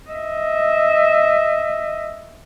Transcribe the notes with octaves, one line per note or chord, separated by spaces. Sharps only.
D#5 E5